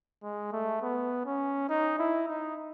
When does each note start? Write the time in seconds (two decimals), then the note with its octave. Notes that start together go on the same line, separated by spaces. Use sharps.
0.23 G#3
0.52 A3
0.82 B3
1.26 C#4
1.69 D#4
1.99 E4
2.28 D#4